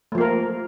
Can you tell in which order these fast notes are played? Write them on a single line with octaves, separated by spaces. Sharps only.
A3 F3 A#3 A#4